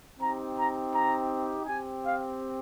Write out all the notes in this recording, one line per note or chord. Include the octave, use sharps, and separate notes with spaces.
C4 D#4 G4 A#5
A#5
A#5
C4 G4 G#5
F5